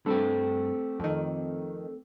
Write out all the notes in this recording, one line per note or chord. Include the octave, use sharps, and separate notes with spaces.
G2 A3 C4 G4
F2 D#3